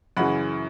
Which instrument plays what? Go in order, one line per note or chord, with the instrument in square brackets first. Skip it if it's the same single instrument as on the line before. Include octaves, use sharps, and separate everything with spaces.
[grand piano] F#2 C#3 E3 F#5 B5